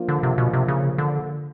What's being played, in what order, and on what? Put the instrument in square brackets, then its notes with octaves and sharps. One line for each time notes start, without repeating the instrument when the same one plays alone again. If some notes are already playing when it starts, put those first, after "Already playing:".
Already playing: [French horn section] F3 A#3 D4 F4
[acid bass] D3
C3
B2
C3
C#3
D3